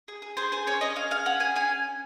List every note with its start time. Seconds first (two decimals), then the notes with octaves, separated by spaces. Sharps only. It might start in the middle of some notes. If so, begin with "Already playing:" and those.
0.08 G#4
0.22 G#4
0.37 G#4 C5
0.52 G#4 C5
0.67 C#4 C#5
0.81 C#4 D#5
0.96 C#4 F5
1.11 G#4 F5
1.26 C#4 F#5
1.40 G#4 G#5
1.56 C#4 G#5